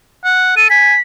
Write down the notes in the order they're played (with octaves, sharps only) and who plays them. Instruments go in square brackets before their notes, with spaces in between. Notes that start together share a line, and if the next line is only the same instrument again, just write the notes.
[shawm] F#5
[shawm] A4 [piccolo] D#7
[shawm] G#5 [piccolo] B6